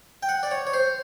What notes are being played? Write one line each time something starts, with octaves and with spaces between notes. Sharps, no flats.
G5
F#5
D5
C#5
C#5
C5